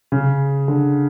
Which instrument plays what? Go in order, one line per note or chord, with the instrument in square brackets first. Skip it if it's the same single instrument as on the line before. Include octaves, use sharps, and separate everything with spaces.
[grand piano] C#3
D3